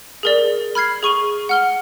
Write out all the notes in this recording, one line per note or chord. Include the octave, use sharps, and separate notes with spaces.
G#4 A#4 D5
B5 F6 G#6 C7
G#4 C#6 D#7 G7
F#5 F6 G7